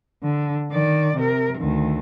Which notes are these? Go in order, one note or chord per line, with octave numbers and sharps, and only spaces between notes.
D3
D#3 D5
C3 A#4
D2 D#3